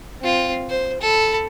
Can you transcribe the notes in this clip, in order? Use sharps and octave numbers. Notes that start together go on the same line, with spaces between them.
C4 F4
C5
A4 B5